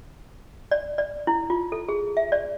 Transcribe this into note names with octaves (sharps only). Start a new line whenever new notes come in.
D5
D5
E4
F4
A4
G#4
E5
D5